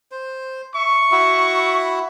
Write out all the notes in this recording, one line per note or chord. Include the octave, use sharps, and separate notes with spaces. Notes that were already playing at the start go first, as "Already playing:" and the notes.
C5
E5 C#6
E4 F#4 E5